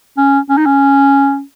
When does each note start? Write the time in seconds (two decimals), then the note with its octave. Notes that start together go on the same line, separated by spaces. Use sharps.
0.18 C#4
0.49 C#4
0.57 D#4
0.66 C#4